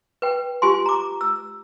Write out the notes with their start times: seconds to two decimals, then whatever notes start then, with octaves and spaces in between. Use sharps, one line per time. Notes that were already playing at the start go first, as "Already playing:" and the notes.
0.22 B4 G5
0.62 F4 G4 G#5 C6
0.86 A#5 D6
1.21 E6